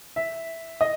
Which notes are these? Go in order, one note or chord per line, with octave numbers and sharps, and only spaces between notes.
E5
D#5